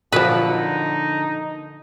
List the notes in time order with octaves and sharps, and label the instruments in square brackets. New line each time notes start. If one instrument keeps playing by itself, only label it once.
[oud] A#2 D3 A#4 [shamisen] F3 F#3 [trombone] F#4 [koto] B4
[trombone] D#4